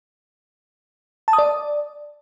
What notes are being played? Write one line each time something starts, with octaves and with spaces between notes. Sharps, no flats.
A5
D#6
D5